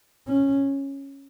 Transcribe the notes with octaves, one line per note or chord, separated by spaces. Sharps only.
C#4